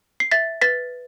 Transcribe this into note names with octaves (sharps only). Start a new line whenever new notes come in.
C7
E5 A6 B6
B4 A6 B6